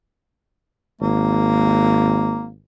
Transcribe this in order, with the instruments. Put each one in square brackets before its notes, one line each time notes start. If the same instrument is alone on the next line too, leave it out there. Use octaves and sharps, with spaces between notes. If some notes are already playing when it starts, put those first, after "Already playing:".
[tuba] G#1 [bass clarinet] A#3